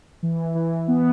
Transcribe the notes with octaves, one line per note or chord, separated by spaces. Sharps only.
E3
E3
B3